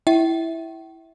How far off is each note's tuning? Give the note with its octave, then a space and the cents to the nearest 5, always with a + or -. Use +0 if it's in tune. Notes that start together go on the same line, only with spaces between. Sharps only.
E4 +0 E5 -10 G5 -40